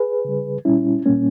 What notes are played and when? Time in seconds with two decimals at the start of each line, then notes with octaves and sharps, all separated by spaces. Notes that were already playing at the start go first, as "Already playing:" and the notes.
Already playing: G#4 B4
0.25 C#3 G3
0.65 A#2 G3 C#4 E4
1.05 A#2 G3 A#3 C#4